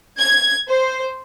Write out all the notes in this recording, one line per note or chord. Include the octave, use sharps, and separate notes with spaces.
G#6
C5